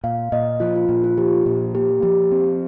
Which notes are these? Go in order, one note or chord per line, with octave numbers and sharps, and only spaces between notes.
A#2 F5
A#2 D#5
F3 F4
F4
A#2
F4
F3 G4
A#2
A#3 G4
F3 G4
C4